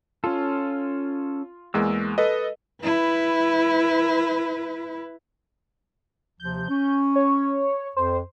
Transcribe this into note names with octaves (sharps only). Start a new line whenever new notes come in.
C#4 F4 A4
E2 G#3 A#3 E6
A4 B4 D#5
E4 B4
D#2 C3 F3 G6
C#4
C#5
F2 C5